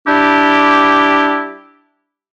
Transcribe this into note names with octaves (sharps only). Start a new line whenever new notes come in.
G3 D4 E4 G4